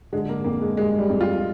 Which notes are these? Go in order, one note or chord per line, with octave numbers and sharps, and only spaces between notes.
D3 G#3
A#3
F2 A#3
G#3
G3 G#3
G3
F2
F4